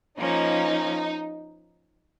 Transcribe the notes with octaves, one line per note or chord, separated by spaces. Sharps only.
F3 A#3 C#4 D#4